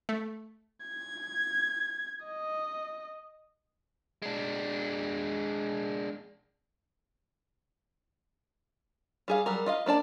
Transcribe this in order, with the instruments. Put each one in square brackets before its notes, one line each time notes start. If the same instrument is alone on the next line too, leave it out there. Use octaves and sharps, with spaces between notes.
[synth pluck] A3
[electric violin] G#6
D#5
[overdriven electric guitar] G#3 D4
[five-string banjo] G3 G#4 F5
F#3 G3 A#4
F4 D#5 F5
A#3 D4 D5 A5